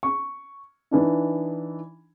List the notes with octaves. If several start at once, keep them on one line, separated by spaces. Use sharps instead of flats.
C#6
E3 D4 D#4